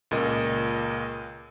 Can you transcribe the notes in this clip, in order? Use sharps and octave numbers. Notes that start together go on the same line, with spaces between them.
C#2 A#2 A#4 D#5